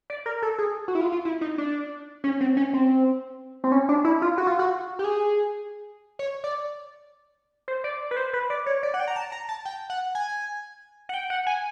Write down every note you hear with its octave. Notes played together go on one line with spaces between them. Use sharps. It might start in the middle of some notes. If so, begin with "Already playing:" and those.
D5
A#4
A4
G#4
F#4
E4
F4
F4
E4
D#4
D4
C#4
C4
C#4
C4
C4
C#4
D4
E4
F4
F#4
F4
F#4
G4
G#4
C#5
D5
C5
D5
B4
C5
B4
D5
C#5
D5
F#5
G5
A#5
A5
A#5
A5
G5
F#5
G#5
F#5
G5
F#5
G#5